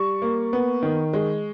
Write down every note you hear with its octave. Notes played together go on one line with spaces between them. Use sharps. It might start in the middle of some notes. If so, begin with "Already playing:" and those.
Already playing: G3 C#6
A#3
B3
D#3
G#3